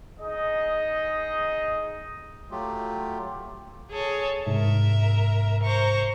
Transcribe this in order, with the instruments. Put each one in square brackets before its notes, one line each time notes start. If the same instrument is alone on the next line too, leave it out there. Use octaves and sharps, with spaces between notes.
[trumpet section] D#4 G#4 D#5
[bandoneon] F#3 A3 F4 G4
[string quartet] G#4 A4 C#5
[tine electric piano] G#2 C3 [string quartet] A#4 E5
[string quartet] C5 A#5 C#6